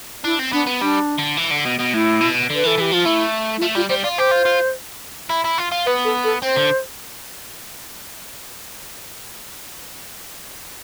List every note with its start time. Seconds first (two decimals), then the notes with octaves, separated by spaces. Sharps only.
0.24 D4 E4
0.39 C4
0.53 B3 D4
0.67 B3
0.81 G3 D4
1.18 D3
1.37 E3
1.51 D3
1.66 B2
1.79 B2
1.94 A2 E4
2.21 B2
2.50 D3 B4
2.64 E3 A4
2.78 E3 G4
2.92 F3 F4
3.05 A3 E4
3.58 E4
3.61 A3 F4
3.75 G3 F4
3.89 G3 C5
4.03 F4 D5
4.18 G4 C5
4.31 F4
4.45 F4
5.30 E4
5.44 E4
5.58 F4
5.72 F4
5.86 B3 B4
6.05 A4
6.24 A4
6.43 C4 C5
6.56 D3